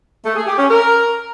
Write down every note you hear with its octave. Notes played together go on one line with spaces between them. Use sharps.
A3
G#4
G4
C#4
A#4